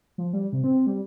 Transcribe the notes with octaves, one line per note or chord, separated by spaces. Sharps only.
F3
G3
C3
C4
G3